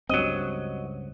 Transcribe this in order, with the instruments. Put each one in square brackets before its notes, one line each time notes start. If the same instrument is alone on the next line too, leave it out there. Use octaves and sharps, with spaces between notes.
[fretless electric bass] C#2 G2 C4 [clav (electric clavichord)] F#3 D#5